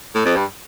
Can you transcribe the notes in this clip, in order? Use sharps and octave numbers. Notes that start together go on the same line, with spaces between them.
A2
F2
G2